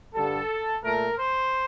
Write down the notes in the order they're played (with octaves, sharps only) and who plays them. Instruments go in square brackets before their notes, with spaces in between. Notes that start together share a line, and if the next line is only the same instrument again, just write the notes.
[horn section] G2 D3 G3 A4
A#2 A3 A#4
C5